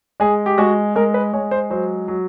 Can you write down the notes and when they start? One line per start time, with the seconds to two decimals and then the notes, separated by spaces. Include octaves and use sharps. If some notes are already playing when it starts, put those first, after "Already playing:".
0.20 G#3 G#4
0.46 G4
0.58 G#3 F#4
0.95 G#3 A#4
1.14 B4
1.33 G#3 C#5
1.51 C5
1.70 F#3 C5
2.08 F#3